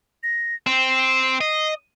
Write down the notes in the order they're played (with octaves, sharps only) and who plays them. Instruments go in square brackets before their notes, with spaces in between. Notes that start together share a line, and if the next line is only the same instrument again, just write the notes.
[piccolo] A#6
[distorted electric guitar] C4 [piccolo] C7
[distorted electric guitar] D#5